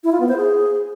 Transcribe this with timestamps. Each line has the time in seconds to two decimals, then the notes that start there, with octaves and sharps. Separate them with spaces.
0.04 E4
0.12 F4
0.20 B3
0.29 C5
0.37 G#4